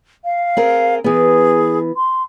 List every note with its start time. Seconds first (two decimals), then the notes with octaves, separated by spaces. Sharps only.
0.24 F5
0.57 C4 G#4 A#4
1.04 E3 B3 G#4
1.96 C6